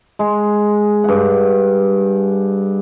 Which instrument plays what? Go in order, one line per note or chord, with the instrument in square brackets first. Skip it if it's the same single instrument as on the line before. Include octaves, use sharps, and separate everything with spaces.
[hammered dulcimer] G#3
G2 F#5